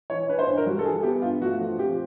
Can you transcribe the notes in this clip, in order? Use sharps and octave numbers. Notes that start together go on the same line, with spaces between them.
E3 C#5
C#4 B4
C5
G2
A#4
G3 F#4
A4
E3 G#4
B3 G4
G2 F4
A3 F#4
F3
C4 G4